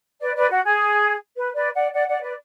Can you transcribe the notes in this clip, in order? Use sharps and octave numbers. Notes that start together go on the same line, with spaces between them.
B4 D5
B4 D5
F#4
G#4
B4
B4 D5
D5 F#5
D5 F#5
D5 F#5
B4 D5